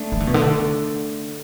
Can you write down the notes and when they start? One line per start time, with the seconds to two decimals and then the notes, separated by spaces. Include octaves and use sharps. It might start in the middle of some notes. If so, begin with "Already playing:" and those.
Already playing: A3 D4
0.12 E3
0.20 D3
0.27 B2
0.34 D3